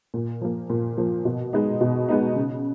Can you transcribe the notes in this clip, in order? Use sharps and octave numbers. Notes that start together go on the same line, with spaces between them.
A#2
F3 A#3
A#2
F3 A#3
B2
G#3 B3 D#4
B2
G#3 B3 D#4
C#3